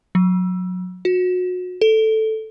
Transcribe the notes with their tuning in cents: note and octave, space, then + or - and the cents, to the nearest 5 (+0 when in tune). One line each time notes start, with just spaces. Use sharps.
F#3 -25
F#4 -30
A4 +0